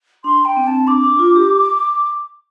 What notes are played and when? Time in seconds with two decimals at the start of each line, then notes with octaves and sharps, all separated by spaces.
0.24 D4 C6
0.45 G5
0.57 C4
0.67 A5
0.87 D4 D6
1.03 D4
1.19 F4
1.36 G4